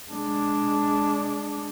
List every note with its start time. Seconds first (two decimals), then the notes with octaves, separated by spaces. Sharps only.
0.11 G#3 D4